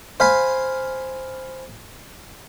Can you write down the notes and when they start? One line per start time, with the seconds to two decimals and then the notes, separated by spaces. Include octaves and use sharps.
0.20 C5 F5 G#5 B5